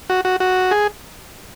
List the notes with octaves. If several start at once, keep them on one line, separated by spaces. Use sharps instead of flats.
F#4
F#4
F#4
G#4